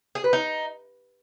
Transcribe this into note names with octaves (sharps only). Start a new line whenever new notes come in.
G#4
B4
D#4